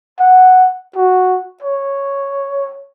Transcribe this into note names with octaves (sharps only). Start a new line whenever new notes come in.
F#5
F#4
C#5